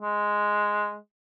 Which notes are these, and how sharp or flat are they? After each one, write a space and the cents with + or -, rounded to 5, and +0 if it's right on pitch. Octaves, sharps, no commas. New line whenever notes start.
G#3 +0